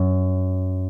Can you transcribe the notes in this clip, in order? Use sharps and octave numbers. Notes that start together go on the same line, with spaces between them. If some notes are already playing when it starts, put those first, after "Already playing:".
Already playing: F#2